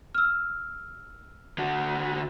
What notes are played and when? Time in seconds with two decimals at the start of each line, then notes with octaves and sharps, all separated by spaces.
0.15 E6 F6
1.58 D3 F#4